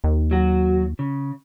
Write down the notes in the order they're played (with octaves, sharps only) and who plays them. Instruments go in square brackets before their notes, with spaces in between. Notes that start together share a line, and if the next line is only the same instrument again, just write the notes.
[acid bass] D#2
[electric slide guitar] F#3 F#4
C#3